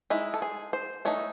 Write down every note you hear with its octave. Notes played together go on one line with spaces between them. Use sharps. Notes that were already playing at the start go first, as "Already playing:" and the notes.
G#3 D#4 E4
A4
G#4
C5
E3 A3 D#4 C#5